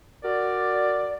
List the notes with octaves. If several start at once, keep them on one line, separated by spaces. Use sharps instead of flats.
F#4 A#4 D5